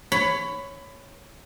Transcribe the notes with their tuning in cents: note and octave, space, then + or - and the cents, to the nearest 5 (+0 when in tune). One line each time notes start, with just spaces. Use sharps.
C#5 +0 B5 +20